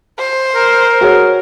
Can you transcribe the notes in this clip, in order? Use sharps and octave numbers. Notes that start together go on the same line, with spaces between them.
C5
A#4
F#4 G#4 C#5